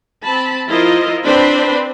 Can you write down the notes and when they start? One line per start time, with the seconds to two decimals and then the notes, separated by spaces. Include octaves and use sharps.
0.24 C4 A5 B5
0.68 F3 E4 F4 A#4 C5 D#5
1.25 C4 D4 B4 C5 B5